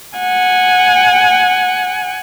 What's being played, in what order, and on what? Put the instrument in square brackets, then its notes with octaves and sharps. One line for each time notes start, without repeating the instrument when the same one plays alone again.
[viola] F#5 G#5